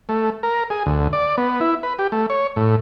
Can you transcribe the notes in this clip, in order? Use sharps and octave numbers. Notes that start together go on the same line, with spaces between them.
A3
A#4
G#4
D2
D5
B3
E4
B4
G4
A3
C#5
A2